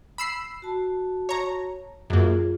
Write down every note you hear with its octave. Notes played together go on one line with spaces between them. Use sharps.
B5 E6 C7
F#4 A5
C#5 A#5
F#2 A#3 F4 G#4